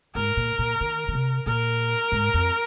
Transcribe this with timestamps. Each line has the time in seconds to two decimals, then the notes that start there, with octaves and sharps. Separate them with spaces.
0.15 G#2 A#4
0.37 A#2
0.59 A#2
0.81 D#3
1.08 D#3
1.14 C3
1.46 A#2 A#4
2.12 G#2
2.34 F2